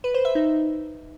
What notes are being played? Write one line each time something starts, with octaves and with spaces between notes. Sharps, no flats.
B4
C5
E5
D#4